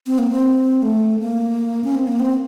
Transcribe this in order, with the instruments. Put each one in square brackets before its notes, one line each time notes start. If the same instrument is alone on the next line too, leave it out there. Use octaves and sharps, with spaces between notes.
[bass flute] C4
A#3
C4
A3
A#3
C#4
C4
A#3
C4